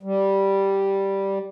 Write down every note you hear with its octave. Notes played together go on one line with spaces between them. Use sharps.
G3